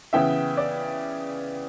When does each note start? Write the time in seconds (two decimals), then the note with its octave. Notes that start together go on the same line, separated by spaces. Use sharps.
0.13 C#3 E3 B3 E5 G5
0.57 D5